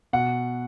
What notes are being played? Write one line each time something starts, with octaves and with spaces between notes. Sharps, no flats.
B2 F#5